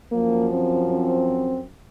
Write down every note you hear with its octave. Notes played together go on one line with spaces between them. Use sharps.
F#2 F3 A#3
C4
C4